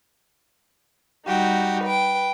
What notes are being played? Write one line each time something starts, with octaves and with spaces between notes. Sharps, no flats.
G3 D#4 F#4 G4
B4 G5